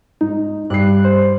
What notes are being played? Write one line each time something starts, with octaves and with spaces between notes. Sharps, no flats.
G#2 D#4
G2 F#6 C7
C5